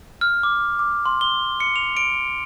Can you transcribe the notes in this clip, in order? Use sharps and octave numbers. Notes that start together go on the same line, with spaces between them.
F6
D6
D6
C6
G7
C#7
F7
D7